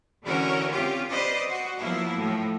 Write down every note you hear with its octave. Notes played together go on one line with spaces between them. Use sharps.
D3 E3 C#4 F#4 A#4
C4 C#4 F4 G4
B4 C5 D5 D#5
F#4 C5
F3 F#3 A#3 B3 E4
A2 F3